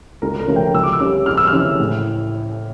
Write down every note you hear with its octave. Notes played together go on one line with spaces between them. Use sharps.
C#2 A#4
A#4
C#3 F3 A3
G5
C#2 E6
D6
E6
C#3 G3
F2 F6
E6
F6
C#3 E3
A2